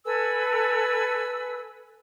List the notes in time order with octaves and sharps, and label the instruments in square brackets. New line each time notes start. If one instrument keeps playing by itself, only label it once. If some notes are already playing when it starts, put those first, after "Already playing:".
[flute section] A4 B4 G#5 E6